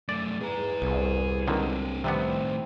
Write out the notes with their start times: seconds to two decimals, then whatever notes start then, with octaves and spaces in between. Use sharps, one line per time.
0.09 F#2 A3 D5
0.41 E2 G#4 A#5
0.82 C2
1.47 C#2 D3 D#3 C4 D4
2.04 A2 C3 D#3 G3 B3 C4